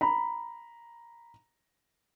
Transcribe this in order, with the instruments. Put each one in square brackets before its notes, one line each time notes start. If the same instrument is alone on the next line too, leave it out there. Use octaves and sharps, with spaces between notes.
[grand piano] A#5 B5